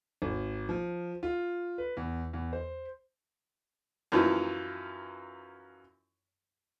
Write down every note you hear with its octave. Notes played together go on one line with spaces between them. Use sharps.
G#1
F3
F4
B4
E2
E2
C5
F#2 E3 F3 D#4